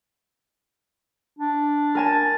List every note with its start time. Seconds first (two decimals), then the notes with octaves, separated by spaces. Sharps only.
1.39 D4
1.95 A#4 G#5 A5